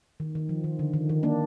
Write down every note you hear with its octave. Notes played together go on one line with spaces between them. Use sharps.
D#3
D#3
F3
D#3
D3
D#3
D#3
A#3 D4